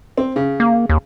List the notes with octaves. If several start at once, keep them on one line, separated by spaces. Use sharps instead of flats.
C4
C#3
A#3
D#2